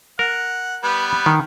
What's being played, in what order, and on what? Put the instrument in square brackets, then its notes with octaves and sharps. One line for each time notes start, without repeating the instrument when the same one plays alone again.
[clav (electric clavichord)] A#4 [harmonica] F#5
[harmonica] G3 B3 B4
[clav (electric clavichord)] D#3